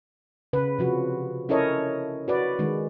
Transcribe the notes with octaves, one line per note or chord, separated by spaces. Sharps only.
C#3 B4
C3 F3 F#4
C#4 E4 A4 A#4 C#5 D#5
F#4 B4 D5
D#3 G#3